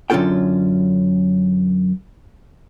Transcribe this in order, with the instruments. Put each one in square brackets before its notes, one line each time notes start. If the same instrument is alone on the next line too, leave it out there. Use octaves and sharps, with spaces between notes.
[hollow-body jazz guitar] F#2 D3 C#4 F4 A4 G5